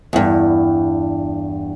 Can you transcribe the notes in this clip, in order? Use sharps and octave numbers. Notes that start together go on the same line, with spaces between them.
E2 G2